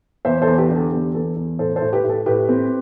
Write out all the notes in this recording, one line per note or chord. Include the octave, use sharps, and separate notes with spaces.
E2 C5 E5
A4 C5
E2
G4 B4
D3 G4
A4
E2 G4
E2 A4
E2
A2 A4 C5
A4 C5
A2
G4 B4
A2
A4
A2 G4 B4
C4